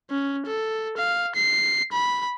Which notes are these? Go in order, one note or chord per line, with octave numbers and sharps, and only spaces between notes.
C#4
A4
F5
C7
B5